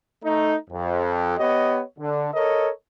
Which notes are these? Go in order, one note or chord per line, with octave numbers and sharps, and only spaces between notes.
A3 D#4
F2
B3 G4 C#5 D#5
D3
A4 A#4 C#5 D#5